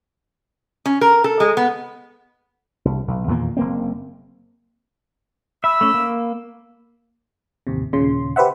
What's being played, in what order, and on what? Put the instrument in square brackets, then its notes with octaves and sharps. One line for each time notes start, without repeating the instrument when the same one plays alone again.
[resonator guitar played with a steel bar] C#4
A#4
A4
G#3
B3
[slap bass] C2
B1
E2 A#2 D#3 A#3
F#1 A#3 C4
[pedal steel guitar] E5 [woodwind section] B5 E6
[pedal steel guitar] A3 C#4
A#3
[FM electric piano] A1 D#2 C3
D#2 A#2 C#3 C6
G4 B4 C5 E5 F#5